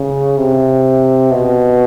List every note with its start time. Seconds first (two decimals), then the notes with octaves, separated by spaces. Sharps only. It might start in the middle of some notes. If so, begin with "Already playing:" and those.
Already playing: C#3
0.38 C3
1.31 B2